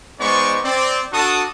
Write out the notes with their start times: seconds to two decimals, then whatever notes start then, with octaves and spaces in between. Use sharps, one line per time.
0.20 G#3 B3 D#4 C5 D5 C#6
0.64 C4 D5
1.13 D4 F#4 A4 A5 C#6 D#6